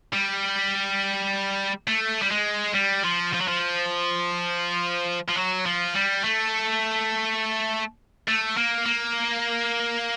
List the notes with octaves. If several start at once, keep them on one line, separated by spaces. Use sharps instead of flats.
G3
A3
G3
G#3
G3
F3
F3
F#3
F3
F3
F#3
F3
G3
A3
A3
A#3
A#3